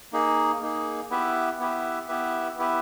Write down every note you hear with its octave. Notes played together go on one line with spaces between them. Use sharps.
A#3 D#4 G#4
A#3 D#4 G#4
B3 E4 G4 B4 E5
B3 E4 G4 B4 E5
B3 E4 G4 B4 E5
B3 E4 G4 B4 E5